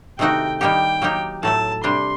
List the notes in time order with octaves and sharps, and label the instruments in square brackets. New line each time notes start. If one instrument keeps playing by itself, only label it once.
[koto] C3 D#3 A3 D#4 F#4 [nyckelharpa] G5
[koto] D#3 G3 A#3 D#4 G4 [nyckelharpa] G5
[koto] F#3 A#3 D#4 G4
[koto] A2 F#3 A3 [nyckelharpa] A5
[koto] C3 G3 D4 [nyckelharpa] C6